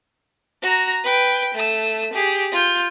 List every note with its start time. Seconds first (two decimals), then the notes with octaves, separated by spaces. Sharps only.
0.62 F#4 A#5
1.04 B4 G5
1.55 A3 E6
2.13 G4 G#4
2.52 F4 G6